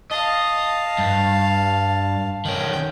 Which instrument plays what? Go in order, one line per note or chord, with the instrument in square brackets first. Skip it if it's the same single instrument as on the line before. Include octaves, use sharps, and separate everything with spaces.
[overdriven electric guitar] D#5 [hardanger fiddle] F5 A5
[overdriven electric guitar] G2
[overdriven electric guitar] D#3 C#4 [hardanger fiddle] G5